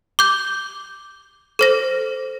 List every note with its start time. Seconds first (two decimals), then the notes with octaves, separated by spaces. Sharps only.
0.19 D6 G6
1.59 A4 C5 A#6